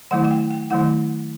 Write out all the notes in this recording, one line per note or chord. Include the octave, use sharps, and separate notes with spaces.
D#3 F#3 A3 E4 F#5
F#5
G5
G5
D#3 F#3 A3 E4 F#5